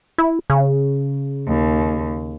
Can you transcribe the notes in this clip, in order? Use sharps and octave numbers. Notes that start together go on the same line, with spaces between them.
E4
C#3
D#2